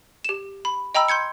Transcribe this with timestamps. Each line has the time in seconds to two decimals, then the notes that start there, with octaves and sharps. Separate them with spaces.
0.25 G4 E7
0.65 B5
0.95 D#5 G5 A#5 B5 E6
1.08 C6 G6 G#6 C#7